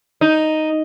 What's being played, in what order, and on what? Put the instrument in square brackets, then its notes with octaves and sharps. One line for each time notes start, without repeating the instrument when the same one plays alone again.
[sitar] D#4